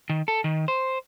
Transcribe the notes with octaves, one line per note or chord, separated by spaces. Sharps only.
D#3
A4
D#3
C5